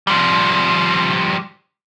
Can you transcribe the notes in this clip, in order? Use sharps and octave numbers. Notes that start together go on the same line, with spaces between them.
F3 G3